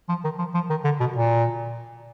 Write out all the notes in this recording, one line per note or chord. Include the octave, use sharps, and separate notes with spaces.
F3
D#3
F3
F3
D#3
D3
B2
A#2